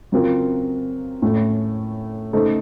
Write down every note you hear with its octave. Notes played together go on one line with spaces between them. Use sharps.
C#3 F#3 C4 F4 A#4
A2 A3 C#4
C#3 A3 D#4 A4 C5